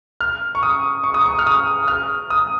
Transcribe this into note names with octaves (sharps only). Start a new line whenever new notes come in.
F6
C#6
D#6
C#6
D#6
C#6
F6
D#6
F6
D#6